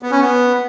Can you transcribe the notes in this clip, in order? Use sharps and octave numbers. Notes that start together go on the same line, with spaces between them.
B3
C#4
B3